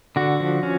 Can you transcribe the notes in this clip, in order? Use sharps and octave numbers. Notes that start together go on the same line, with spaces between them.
D3 F#4
F3
C#4